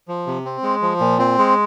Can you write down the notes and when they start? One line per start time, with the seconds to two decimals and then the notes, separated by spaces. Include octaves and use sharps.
0.08 F3
0.27 C3
0.45 C4
0.63 G#3
0.82 F3
1.00 A#2
1.19 C4
1.38 G#3